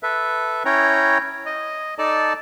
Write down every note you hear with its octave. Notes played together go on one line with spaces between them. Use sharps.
A4 B4 E5
C#4 E4 C#5 G5 A#5
D#5
D#4 A4 D5 A5